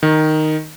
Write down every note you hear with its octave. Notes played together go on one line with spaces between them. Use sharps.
D#3